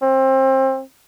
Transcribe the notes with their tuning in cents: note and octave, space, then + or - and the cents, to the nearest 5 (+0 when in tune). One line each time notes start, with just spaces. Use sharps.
C4 +25